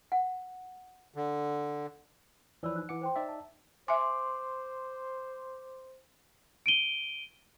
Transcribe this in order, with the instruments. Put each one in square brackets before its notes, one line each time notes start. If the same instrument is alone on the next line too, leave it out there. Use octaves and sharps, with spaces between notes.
[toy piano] F#5
[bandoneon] D3
[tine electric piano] E3 F3 B4 [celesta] C#5 D5 E6
[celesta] D#4 F#6
[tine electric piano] E3 D6 C#7 [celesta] F#5
[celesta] C5 G5 C6
[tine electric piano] D#4 D5 E5
[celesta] A5
[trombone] C5 [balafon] E5 G#5 [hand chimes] C6 D6
[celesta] D7 D#7 G7